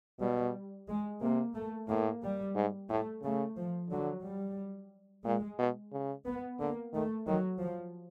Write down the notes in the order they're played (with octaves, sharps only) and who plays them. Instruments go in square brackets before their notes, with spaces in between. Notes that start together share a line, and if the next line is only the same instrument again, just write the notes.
[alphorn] B2 [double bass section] G3
[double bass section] G#3
[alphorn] C3 [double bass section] A#3
[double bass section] A3
[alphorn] A2 [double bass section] A#3
[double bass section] G3
[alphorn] G#2
[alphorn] A2 [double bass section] A3
[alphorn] C#3 [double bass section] A3
[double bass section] F3
[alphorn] D3 [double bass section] F#3
[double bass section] G3
[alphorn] A#2 [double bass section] G#3
[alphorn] B2
C#3
[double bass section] B3
[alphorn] D3 [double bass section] A#3
[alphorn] D#3 [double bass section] A3
[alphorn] D#3 [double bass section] F#3
[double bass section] F3